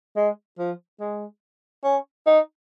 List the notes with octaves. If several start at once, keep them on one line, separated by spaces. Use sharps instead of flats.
G#3
F3
G#3
C#4
D#4